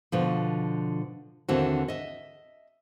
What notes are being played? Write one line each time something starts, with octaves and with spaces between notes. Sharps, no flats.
B2 D3 F3
D#2 D3 E3 C4 F#4
D#5 E5